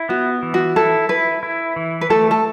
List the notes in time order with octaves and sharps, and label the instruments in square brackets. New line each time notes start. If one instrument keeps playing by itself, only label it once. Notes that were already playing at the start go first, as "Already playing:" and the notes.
Already playing: [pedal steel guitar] E4
[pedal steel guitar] B3 [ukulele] F#4
[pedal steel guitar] E3
[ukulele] F#4
[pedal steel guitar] E4 [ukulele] A4
[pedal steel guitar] E4 [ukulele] B4
[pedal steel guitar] E4
E3
[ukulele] B4
[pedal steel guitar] A3 [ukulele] A4
[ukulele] A4